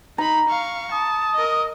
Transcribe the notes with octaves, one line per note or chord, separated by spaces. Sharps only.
D#4 A#5 B5
F5 C#6
A5 D#6
A#4 D#5